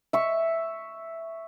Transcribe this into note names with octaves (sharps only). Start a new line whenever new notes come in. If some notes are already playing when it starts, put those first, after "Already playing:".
E5 C#6